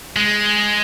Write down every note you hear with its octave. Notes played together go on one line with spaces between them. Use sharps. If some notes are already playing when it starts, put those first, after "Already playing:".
G#3